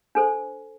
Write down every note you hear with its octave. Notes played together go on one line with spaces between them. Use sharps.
D4 A4 C5